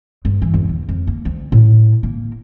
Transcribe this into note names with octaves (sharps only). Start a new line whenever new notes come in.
G2
E3
E2
D#2
F2
A#3
D2
A2
A#3